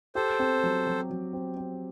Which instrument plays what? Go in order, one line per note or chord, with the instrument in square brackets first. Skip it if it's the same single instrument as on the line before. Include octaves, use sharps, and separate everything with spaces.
[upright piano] G4 [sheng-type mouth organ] A4 C5
[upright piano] C4
F#3
F#3
F#3
C4
C4